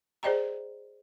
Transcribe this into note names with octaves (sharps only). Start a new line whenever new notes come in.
G#4 C5 D5 D#5 G5 A#5